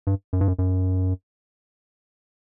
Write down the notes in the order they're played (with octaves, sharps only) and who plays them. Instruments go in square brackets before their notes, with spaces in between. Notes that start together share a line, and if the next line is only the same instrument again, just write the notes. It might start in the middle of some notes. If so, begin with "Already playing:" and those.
[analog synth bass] G2
F#2
G2
F#2
F#2